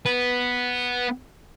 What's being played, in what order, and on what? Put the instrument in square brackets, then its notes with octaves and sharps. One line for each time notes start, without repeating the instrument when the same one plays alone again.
[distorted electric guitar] B3 B4